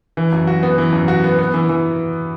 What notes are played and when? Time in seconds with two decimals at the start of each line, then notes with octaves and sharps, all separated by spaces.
0.17 E3
0.32 F#2
0.47 F#4
0.63 B3
0.78 E3
0.93 F#2
1.08 F#4
1.24 B3
1.39 B3
1.54 E3
1.69 E3